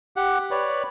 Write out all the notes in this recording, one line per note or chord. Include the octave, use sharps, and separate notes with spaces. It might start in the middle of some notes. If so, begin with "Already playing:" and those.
G4 F#5
B4 C#5 D5